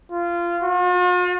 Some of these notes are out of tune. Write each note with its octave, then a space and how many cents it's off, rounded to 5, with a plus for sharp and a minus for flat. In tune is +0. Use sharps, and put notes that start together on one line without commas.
F4 -20
F4 +45